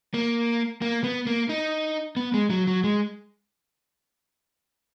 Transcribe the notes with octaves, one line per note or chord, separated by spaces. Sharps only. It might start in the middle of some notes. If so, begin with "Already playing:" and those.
A#3
A#3
B3
A#3
D#4
B3
G#3
F#3
F#3
G#3